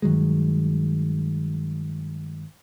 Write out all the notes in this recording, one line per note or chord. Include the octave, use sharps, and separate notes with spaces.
G2 D#3 F#3 G#3